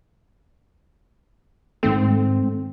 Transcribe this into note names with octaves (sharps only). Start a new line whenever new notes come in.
G#2 D#3 A3 C4